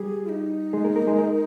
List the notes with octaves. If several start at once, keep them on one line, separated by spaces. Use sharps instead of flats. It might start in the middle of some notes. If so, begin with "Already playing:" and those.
Already playing: G3 G4 G#4
F4
D#4
G#3 G#4
A#3 A#4
A#3 A#4
G#3 G#4
A#4